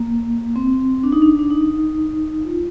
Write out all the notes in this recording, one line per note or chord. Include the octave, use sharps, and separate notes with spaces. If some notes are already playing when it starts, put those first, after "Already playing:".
Already playing: A#3
C4
D4
D#4
D4
D4
D#4
F4